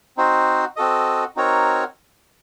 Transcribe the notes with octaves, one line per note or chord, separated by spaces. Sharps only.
C4 D#4 F#4 C5
C4 F#4 A4 D#5
C4 D#4 F#4 A#4 C#5